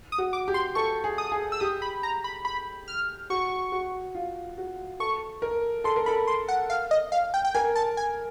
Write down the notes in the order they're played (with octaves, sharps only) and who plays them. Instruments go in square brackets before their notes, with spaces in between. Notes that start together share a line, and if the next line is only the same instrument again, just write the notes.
[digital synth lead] D#6
[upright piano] F#4
[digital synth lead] D6
[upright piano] G4
[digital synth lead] C6
[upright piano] A4 [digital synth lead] C#6
[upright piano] G#4
[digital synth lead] D#6
[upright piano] G#4
[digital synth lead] E6
[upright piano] G4 [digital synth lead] D#6
[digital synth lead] B5
A#5
B5
B5
F6
[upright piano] F#4 [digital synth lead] C#6
[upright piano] F#4
F4
F#4
[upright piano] A4 [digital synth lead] C#6
[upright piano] A#4
[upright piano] A4 [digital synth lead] C6
[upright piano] A#4
[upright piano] A4 [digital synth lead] B5
[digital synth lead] C6
F#5
F5
D#5
F5
G5
G5
[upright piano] A#4 [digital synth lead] G#5
[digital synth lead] A5
G#5